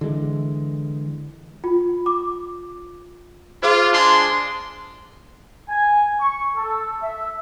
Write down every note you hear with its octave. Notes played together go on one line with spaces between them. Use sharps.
D3 E3 G#3
F4
D6
F4 G#4 C5
G#3 D4 C6
G#5
C#6
A4
E5